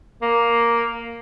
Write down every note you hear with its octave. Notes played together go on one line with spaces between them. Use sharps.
A#3